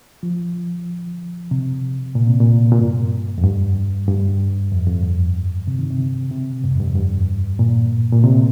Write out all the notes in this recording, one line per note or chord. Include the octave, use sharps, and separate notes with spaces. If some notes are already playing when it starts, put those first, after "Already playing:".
F3
C3
A#2
C3
A#2
A#2
G2
F2
G2
G2
F2
F2
G2
C3
D#3
C3
C3
G2
F2
G2
F2
G2
A#2
A#2
C3